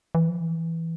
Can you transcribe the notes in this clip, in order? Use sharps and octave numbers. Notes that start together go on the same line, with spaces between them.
E3
F3
E3